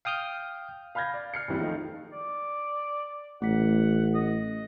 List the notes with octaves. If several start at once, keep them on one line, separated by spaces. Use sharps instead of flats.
F5 G5 D#6 F6 G6
F5 B5 F6 G6 G#6 A#6
D5
F6 C7 C#7
A#1 F2 E3 G3
D#3 F3 A3 D#4
D5
A1 A3 F#5 B6
D#5